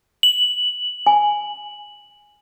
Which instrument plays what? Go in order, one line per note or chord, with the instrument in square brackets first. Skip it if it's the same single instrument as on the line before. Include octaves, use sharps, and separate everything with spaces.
[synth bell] F#7
[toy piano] G#5